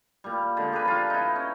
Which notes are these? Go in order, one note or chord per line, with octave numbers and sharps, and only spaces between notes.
A#2 G3
D3 G#3
G4 G#4 A#4 B4
F3 G3 F4
D#4 E4
C#4